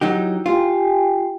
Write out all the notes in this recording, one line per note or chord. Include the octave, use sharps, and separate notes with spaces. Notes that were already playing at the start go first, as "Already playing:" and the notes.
F#3 D#4 E4 G4
F4 G4 G5 G#5